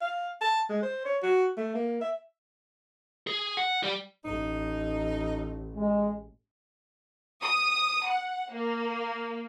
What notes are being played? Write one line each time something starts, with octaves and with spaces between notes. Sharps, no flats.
F5
A5
G#3
C5
C#5
F#4
A3
A#3
E5
G#4
F#5
G4 D5
A1 D#4
G#3
D#6
F#5
A#3